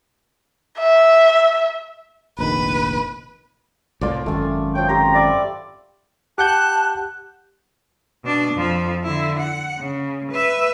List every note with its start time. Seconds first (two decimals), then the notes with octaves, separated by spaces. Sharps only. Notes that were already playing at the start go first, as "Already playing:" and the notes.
0.79 E5
2.39 F1 A#1 D#3 B4
4.01 C2 A2 F4 D5
4.26 G#1 F#2 A3 G#5
4.75 F3 C#4 G5
4.89 C4 G4 C5 A#5
5.14 F4 D5 E5 B5
6.38 G4 F#5 A5 F#6 G6
8.24 B2 D4
8.54 F2 F3
9.03 D3 E4
9.39 F#5
9.79 C#3
10.31 B4 E5